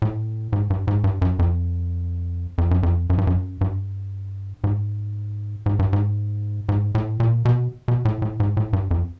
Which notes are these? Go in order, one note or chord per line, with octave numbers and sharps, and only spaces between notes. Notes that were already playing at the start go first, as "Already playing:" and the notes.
A2
G#2
G2
G#2
G2
F#2
F2
F2
F#2
F2
F#2
G2
F#2
G2
G#2
G#2
G2
G#2
G#2
A2
A#2
B2
B2
A2
A2
G#2
A2
G2
F2